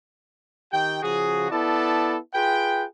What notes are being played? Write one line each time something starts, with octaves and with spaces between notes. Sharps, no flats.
D#3 G4 G5
C#3 F3 F#4 G#4
B3 E4 A4 D5 A5
F4 G#4 B4 G5